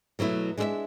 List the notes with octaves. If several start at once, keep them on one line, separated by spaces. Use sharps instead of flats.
B2 F#3 A3 E4
G#3 D4 A4 E5